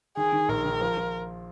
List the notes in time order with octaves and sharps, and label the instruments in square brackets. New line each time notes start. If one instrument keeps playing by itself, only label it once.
[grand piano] D#3 [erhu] G#4
[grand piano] D#3
[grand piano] A#1 [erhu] A#4
[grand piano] D#3
F3
F3